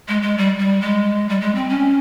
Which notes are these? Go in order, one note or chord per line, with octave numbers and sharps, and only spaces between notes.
G#3
G#3
G3
G3
G#3
G3
G#3
C4
C#4